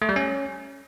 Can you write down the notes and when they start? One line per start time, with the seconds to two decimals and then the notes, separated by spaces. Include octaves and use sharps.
0.02 A3
0.09 G3
0.16 C#4